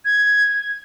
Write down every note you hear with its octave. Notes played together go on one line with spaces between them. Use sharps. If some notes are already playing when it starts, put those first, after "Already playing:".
G#6